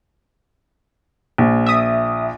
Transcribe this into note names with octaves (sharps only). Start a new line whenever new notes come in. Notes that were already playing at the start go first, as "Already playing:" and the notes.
A#1
E5 D#6